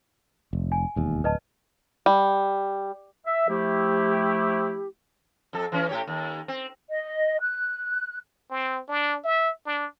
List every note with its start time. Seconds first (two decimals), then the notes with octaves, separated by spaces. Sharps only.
0.53 F1
0.72 G#5
0.96 E1 D#2
1.24 D1 B4 D#5 A5
2.06 G3
3.26 E5
3.49 F3 A3 E4 G4
5.53 F2 A4
5.72 E3 C#4
5.89 A2 G4 C#5
6.07 D#2
6.48 C4
6.89 D#5
7.39 F#6
8.50 C4
8.88 D4
9.24 E5
9.66 D4